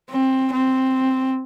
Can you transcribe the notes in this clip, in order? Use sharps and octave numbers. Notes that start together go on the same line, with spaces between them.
C4
C4